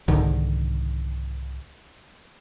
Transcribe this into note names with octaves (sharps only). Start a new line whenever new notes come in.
C2 G#2 D3 D#3